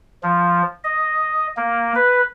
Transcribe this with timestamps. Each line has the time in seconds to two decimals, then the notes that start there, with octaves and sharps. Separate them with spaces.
0.23 F3
0.84 D#5
1.57 A#3
1.95 B4